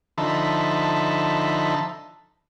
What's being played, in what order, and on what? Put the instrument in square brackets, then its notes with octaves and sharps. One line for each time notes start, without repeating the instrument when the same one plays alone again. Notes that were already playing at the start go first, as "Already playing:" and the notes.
[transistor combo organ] D3 F3 D#4 E5 A5 B5